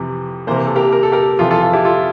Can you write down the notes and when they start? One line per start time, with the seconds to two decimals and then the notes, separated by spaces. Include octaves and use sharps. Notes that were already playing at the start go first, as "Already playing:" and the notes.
Already playing: F2 C3 E3
0.47 C3 E3 A#3 C5
0.56 A#4
0.66 A4
0.76 G4 A#4
0.93 A#4
1.03 A4
1.12 G4 A#4
1.39 F2 C3 E3 F4 A4
1.51 F4 A4
1.62 F4 A4
1.73 E4 G4
1.85 F4 A4